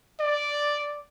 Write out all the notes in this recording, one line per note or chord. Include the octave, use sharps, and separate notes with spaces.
D5